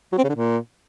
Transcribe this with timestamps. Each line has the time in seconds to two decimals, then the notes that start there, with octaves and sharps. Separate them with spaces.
0.13 F#3
0.18 C4
0.24 C#3
0.29 D3
0.35 A#2